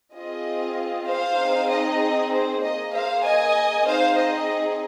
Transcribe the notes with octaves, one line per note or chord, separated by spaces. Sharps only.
C4 F4 G#4 D#5
C5 F5
C4 D#4 G#4
D#5
C5
A#3 G#4 D#5
C5 F5
D#5 G#5
C4 D#4 G#4 C5 F5
D#5